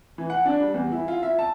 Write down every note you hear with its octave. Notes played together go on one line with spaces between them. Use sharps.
E3
F#5
D4
G3
E2
E4
F4
E5
A5